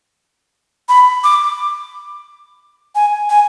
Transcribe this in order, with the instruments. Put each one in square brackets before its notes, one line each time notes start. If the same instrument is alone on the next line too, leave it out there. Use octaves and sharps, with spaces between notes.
[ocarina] B5
D6
G#5
G#5